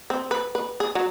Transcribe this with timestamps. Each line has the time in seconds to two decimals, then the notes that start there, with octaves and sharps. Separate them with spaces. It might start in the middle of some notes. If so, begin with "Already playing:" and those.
0.10 C4
0.31 B4
0.55 B4
0.80 G#4
0.95 F#3